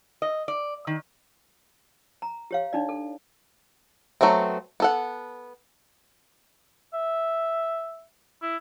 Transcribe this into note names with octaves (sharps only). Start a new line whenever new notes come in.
D#5
D5
D#3
A#5
G4 C#5 F5
D4 D#4 D5
A4
F#3 A3 B3 C4
B3 A4 F#5
E5
E4